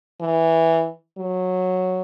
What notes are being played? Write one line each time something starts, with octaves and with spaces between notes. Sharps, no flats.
E3
F#3